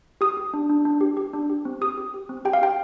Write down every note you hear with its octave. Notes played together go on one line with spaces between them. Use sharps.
G4 D#6
G4
D4
D4
D4
G4
G4
D4
G4
C4
G4 D#6
G4
G4
C4
G4 G5
F5
G4 G5